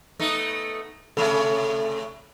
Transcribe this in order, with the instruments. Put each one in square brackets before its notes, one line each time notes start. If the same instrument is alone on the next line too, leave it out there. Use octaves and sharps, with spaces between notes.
[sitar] A3 B3 D#4
[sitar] C3 A3 C#4 [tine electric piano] A4